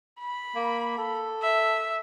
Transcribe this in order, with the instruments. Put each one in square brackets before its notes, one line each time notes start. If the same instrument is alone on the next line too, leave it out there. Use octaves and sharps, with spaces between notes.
[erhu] B5
[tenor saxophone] A#3
A4
[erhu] E5